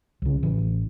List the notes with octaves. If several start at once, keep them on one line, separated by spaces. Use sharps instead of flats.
C2 C#3
A1 E3